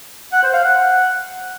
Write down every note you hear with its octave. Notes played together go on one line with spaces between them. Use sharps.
F#5
C5
F5
F#5